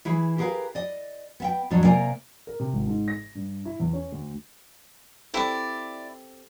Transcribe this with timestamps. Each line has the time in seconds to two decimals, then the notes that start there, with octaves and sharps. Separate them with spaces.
0.05 E3 E4 G#4
0.38 G4 G#4 A#4 B4 F5
0.75 D5 D#5
1.40 B3 E5 G5
1.70 F2 A2 F#3 D4
1.85 C3 A#3 A#4 D5 G#5
2.47 A#4
2.60 C3
2.73 G#1
2.87 G#2
3.08 A#6
3.35 G2
3.65 E4
3.80 E2
3.93 C#4
4.12 D2
5.34 C4 E4 G4 A4 D5